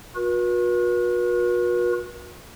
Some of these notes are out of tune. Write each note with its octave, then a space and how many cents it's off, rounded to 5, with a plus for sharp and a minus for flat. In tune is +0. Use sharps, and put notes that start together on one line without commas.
F#4 -40 B4 -45